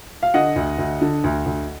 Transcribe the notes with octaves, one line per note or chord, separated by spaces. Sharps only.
F5
D3 D#5 F#5
D2
D2
D3
D2
D2